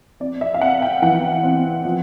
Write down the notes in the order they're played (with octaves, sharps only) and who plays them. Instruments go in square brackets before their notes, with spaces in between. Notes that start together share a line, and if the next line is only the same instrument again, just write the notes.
[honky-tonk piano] C4 D5
E5
F5
C4 F#5
G5
E3 F#5
C4
F3